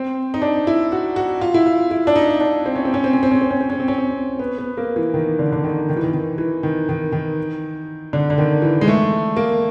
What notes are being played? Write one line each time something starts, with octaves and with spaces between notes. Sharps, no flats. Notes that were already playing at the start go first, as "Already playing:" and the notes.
Already playing: C4
D#4
D4
E4
F#4
F#4
F4
E4
F4
E4
D4
D#4
D4
C4
C#4
C4
C#4
C4
C#4
C4
C#4
C4
C#4
C4
C#4
C4
C#4
C4
B3
B3
A#3
E3
D#3
D3
D3
D#3
D#3
E3
D#3
D#3
E3
D#3
D#3
D#3
D3
D3
D#3
E3
G#3
A3
A#3